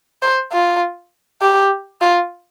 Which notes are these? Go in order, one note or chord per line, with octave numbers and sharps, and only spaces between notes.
C5
F4
G4
F4